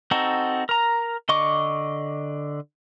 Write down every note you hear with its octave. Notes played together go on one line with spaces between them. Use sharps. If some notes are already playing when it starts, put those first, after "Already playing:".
C4 D#4 F#4 A4
A#4 A#5
D3 D#5 C#6 D6